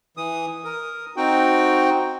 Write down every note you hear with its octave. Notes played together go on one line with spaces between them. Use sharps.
E3 D#6
A#4 D#6
C4 D#4 F#4 G5